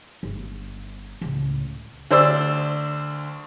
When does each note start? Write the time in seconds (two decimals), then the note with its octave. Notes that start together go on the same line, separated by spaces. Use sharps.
0.23 G1
1.21 C#2 A2
2.11 D2 C5 D5 E6